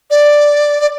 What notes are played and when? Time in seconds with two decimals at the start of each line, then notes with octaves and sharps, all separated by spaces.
0.11 D5
0.80 D5